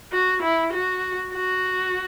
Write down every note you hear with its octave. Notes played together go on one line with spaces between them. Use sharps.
F#4
E4
F#4
F#4